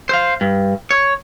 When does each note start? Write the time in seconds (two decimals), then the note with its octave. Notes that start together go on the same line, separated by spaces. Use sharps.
0.09 C5 F5
0.41 G2
0.91 C#5